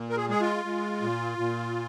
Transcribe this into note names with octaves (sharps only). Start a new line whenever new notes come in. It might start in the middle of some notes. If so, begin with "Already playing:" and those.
Already playing: A#2
A#4
G#4
G#3 G#4
F4
G#3
A#2
A#2